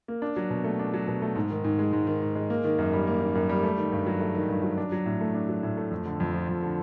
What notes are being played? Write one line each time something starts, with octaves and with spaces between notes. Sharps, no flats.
A#3
D4
F#3
B2
A3
D4
F#3
B2
A3
G#2
D#3
G#2
G#3
G#2
D#3
G#2
G#3
A#3
D#3
F#2
G3
A#3
D#3
F#2
G3
A3
D#3
G2
F#3
A3
D#3
G2
F#3
D4
F#3
A2
A3
D4
F#3
A2
A3
F2
D3
F2
F3
F2
D3